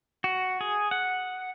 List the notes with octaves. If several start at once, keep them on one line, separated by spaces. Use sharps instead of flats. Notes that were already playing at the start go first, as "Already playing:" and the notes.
F#4
G#4
F#5